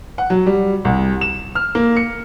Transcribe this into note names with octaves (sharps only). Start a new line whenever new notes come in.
F#5
F#3
G3
C2
E7
F6
A#3
C#7